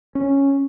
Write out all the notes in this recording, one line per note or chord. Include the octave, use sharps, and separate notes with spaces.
C#4